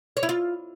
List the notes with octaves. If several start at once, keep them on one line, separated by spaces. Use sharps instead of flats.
C#5
E4
F4